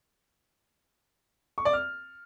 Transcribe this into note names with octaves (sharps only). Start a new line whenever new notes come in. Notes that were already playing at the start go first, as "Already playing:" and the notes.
C#6
D5
F6